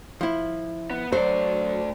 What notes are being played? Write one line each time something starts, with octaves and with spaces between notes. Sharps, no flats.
F3 E4
B3
F#3 A3 C5 D5